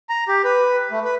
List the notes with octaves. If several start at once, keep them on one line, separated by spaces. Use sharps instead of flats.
A#5
G4
B4
A3
B4